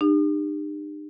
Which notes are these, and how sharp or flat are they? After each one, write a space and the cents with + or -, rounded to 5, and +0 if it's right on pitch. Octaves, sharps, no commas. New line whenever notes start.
D#4 -45 G4 +35